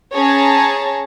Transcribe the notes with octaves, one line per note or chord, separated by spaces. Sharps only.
C#4 G#4 C#5 A5 A#5